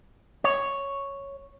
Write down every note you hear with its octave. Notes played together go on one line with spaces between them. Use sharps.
C#5